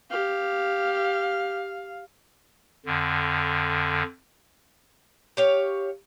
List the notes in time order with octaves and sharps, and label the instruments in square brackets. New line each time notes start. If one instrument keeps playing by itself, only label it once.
[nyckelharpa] G4 [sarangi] F5
[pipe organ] F2 D3
[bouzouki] G4 C#5 F5